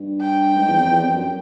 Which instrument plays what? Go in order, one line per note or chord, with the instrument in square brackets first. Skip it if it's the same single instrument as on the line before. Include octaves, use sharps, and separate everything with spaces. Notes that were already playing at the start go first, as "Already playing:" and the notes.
Already playing: [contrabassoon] G2
[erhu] G5
[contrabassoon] G#2
E2
F2
E2
F2
F#2